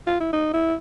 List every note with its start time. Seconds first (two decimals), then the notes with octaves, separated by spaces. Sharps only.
0.07 F4
0.20 E4
0.33 D#4
0.54 E4